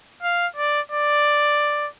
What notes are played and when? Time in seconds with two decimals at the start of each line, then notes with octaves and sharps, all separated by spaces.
0.23 F5
0.57 D5
0.92 D5